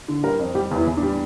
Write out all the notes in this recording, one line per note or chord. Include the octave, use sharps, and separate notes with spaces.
D3
G3 A#4
F2
G3 G4
E2 E4
E2
D4
G3